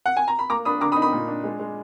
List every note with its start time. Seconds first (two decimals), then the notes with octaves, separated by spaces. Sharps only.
0.06 F#5
0.17 G#5
0.28 A#5
0.39 B5
0.50 A#3 A#5 D6
0.65 D4 B5 D#6
0.81 D3 A#5 D6
0.92 B5 D#6
0.96 D#4
1.02 B5 D#6
1.12 A#2
1.28 D4
1.44 G#3
1.59 G#3